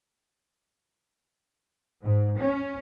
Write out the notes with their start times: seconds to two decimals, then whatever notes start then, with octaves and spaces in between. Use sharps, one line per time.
2.04 G#2
2.39 C#4